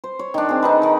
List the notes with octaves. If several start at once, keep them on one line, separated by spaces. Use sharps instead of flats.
C5
C#5
D#3 D4
C4 G#4
D#4 A4 B4
D#3 D#4